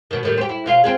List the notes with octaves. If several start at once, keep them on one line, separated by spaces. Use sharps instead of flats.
B2 D#3
A2 D#3 G3
C4 G4
E4
B2 F4 F5
C4 F4 G#4